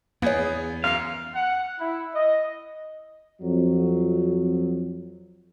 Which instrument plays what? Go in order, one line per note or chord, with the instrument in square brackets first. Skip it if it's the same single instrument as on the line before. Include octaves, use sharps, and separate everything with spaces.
[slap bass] E2 [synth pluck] A#3 C#5 [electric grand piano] B3 G#4
[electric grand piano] F#2 C7 [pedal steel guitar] F5
[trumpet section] F#5
E4
D#5
[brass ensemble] F2 F#3